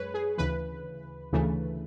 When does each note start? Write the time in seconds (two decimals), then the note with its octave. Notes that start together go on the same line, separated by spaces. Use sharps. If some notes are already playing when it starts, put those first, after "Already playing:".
Already playing: F#2 G#3 B4 C#5
0.14 G#4
0.38 D2 C#3 E3 B4
1.33 D2 C#3 E3 A3